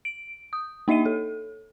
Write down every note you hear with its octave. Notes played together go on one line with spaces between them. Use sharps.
D7
D#6
A#3 D#4 D#5 E5 D#7
A4